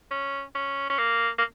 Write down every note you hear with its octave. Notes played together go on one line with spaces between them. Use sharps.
C#4
C#4
C#4
A#3
A#3